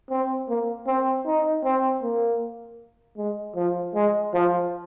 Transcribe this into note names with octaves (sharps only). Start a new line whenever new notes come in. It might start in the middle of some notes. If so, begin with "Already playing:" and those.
C4
A#3
C4
D#4
C4
A#3
G#3
F3
G#3
F3